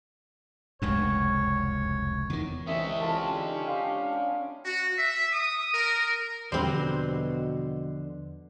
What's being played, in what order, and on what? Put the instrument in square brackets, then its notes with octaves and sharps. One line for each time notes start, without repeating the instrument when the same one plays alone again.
[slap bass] F1 C#2 F#2 [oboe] C#5
[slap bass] E2 D#3
[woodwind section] C2 E3 [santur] C4 [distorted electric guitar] C#4 D#5 [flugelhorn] E5
[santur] E4 F4 A4 [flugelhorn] G4
[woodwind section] D3 G#3 D#4
[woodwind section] D4 F5 [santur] G#5 C6
[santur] D5 D6
[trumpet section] F#4
E5
D#6
A#4
[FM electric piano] E2 F3 [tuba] B2 [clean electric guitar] D3 C5 [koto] G3 C4